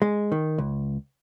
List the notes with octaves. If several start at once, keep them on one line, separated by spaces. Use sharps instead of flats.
G#3
D#3
C#2